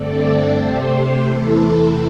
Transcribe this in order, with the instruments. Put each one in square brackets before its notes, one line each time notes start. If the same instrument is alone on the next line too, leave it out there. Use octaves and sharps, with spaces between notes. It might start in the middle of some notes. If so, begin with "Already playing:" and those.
Already playing: [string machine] G2 D3 A3 C4 A4 D5
C3 A3 C4 G4 C5
G4
E2 C3 E3 A3 E4 A4